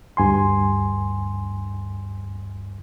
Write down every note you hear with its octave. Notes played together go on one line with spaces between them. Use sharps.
D2 G2 G#5 C6